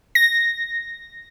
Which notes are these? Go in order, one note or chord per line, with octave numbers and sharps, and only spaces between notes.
A#6